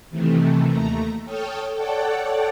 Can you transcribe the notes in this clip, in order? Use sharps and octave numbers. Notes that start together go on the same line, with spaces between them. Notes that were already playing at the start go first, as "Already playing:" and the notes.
C3 D#3 E3 A3
D#2 A3 A#5
A4 C#5 G5 D#6 F6
A4 C#5 D5 F#5 G5 A5